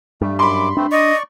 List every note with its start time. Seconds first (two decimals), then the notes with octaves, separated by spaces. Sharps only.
0.22 G2 G3 A3
0.39 F#2 B5 C6 D6
0.77 G2 A3 C4 D4
0.91 D5 D#5 C#6